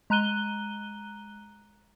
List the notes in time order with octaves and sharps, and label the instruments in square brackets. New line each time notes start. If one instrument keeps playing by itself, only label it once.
[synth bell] G#3 A#5 F#6 D#7 G7